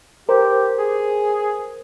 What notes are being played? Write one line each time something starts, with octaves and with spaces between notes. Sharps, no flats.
G4 A#4 C5
G#4